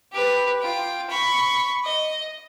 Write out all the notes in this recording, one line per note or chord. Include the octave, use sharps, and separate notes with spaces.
G4 B4
F4 G5
B5 C#6
D#5